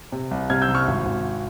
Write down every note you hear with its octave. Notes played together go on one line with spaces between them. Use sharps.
C3
C2
C3 F6 G#6
E6 G6
C2
C#6 F6
G#1
G#1